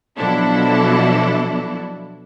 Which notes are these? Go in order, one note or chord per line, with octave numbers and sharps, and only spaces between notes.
B2 F3 F#3 D4 E4 A4